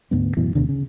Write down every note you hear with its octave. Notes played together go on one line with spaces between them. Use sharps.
D2 G#2 A3 B3
A1 F#2 B2 E3
D2 B2 D3
C#3